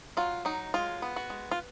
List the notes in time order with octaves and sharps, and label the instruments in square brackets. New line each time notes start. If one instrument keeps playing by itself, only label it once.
[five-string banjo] F#3 F4
F#3 D#4
G#3 F4
B3
F#4
G#3
F4